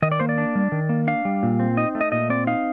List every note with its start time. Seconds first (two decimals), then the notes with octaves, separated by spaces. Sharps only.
0.02 D#3 D#5
0.12 D5
0.20 A#3 C5
0.29 D5
0.38 D4
0.55 G3
0.72 D#3
0.89 A#3
1.07 D4 F5
1.25 G3
1.43 A#2
1.60 C4
1.77 D#4 D#5
1.95 A3
2.01 D#5
2.12 A#2 D#5
2.30 C4 D5
2.47 D#4 F5